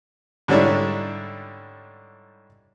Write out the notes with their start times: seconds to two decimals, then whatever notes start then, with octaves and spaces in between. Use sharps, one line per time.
0.48 G#2 D3 G3 C#4 D4 E4